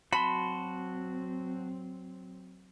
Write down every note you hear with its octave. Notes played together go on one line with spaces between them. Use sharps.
F#3 C4 F#4 A5 B5 C6